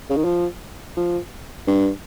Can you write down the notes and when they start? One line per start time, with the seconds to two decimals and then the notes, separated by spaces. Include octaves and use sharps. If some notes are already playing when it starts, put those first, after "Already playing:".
0.10 C#3
0.17 D#3
0.25 F3
0.97 F3
1.68 G2